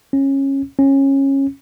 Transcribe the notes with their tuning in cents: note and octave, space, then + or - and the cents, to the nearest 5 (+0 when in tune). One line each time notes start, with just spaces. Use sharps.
C#4 -20
C#4 -20